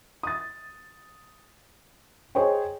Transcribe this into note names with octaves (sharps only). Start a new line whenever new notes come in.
D#6 A6
G#4 C5 C#5 D#5 G5